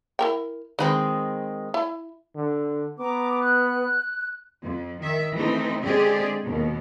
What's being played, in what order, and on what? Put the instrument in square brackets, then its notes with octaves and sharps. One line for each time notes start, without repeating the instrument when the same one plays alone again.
[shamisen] E4 A#4 G5
[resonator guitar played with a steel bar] D#3 G#3 C4 [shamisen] B4 B5
[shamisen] E4
[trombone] D3
[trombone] B3 [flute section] A#5 D6
[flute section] F#6
[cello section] F2
D#3 E5
E3 A3 C4 D#4
D3 G#3 C4 G4 G#4 D5
D#2 B2